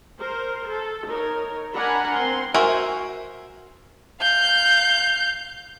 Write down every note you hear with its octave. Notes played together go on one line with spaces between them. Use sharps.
A#4 C5
A4
D#4 A#4 C#5
D4 A#4 F#5 G#5 A#5 B5
C4 C6
F#4 A#4 C5 E5 G#5
F5 G6